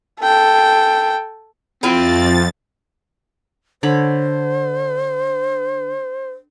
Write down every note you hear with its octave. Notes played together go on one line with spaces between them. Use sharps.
A4 G5
F2 C4 E4 F4 G5 A6
D3 C5 C#5 B5